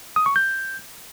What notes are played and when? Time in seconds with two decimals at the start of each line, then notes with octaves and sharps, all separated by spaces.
0.16 D#6
0.26 C#6
0.36 G6